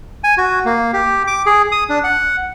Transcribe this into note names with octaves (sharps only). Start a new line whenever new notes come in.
G#5
F#4
A#3
G4
D6
G#4
D#6
D4
F#5